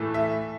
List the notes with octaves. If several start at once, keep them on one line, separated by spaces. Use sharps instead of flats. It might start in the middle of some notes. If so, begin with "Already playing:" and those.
Already playing: A2 E3 A3
E5